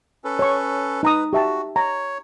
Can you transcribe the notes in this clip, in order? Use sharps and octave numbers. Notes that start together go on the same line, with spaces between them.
C#4 A4 B4
C#5 C#6
D#4 B4 A#5 D#6
F#4 G4 E5 A5
C#5 A#5